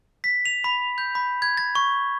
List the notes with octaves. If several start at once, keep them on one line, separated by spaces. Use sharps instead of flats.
B6
F7
B5
G6
B5
G#6
A6
C#6